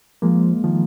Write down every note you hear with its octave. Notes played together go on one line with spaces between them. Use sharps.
F3 G#3 A#3
D#3 F3